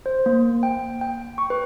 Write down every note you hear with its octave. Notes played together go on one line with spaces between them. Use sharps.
C5
A#3
G5
G5
C#6
B4